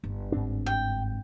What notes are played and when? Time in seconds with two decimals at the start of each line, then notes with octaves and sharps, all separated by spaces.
0.04 G1
0.32 G#2 C4 D4
0.66 G5